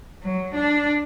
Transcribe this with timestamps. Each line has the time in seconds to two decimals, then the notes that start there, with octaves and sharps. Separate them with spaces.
0.23 F#3
0.55 D4